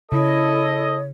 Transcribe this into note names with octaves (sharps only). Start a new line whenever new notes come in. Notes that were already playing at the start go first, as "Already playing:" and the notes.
C#3 E4 A4 C#5 D#5